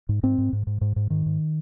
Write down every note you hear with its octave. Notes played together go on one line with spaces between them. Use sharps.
G#2
G#2 C4
G#2
G#2
G#2
G#2
G#2
G#2 D#3
G#2